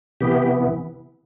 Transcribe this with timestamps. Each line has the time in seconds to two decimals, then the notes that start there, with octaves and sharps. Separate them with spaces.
0.21 C3 E3 B3 G4